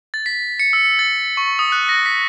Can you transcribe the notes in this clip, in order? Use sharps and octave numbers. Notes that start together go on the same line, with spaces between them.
A6
B6
C#7
E6
A6
C#6
D#6
F#6
A#6
B6